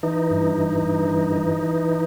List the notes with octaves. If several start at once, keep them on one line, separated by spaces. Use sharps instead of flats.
E3 D#4
G2
E3
G2
E3
E3
E3